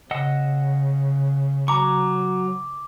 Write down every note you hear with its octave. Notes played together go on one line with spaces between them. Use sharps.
C#3 D#5 F#5 E6
F#3 A#5 C#6 D6